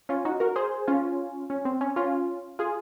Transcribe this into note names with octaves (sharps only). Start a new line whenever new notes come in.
C#4 F4
D#4 F#4
F#4 A#4
G#4 C5
C#4 F4
C#4
C4
C#4
C#4 F4
F4 G#4